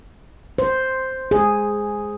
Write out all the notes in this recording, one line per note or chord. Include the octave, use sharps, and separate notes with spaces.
C5
G#4